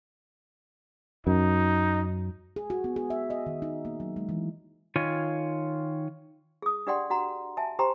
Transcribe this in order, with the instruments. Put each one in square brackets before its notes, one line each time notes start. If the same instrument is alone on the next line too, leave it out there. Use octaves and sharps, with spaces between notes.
[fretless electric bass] F#2 [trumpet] D#4
[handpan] G#4
F#4
B3
G#4
E5
D#5
D#3
D#4
A#3
F#3
G#3
E3
[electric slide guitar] D#3 F4 C#5 G#5
[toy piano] G#4 D#6
D4 G4 D5 F#5 G5 C6
F#4 F#5 A#5 C6
E5 G#5 A5
G4 C5 G5 A#5 C6